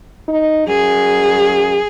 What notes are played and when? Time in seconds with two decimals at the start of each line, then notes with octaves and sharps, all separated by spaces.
0.28 D#4
0.68 F#2 G#4